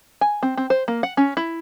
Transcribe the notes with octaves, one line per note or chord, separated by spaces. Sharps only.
G#5
C4
C4
C5
A#3
F#5
C#4
E4